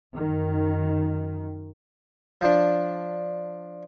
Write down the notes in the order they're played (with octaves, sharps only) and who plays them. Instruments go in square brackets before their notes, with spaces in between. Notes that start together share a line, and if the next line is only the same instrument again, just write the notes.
[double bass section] F#2 D#3
[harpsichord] F3 D4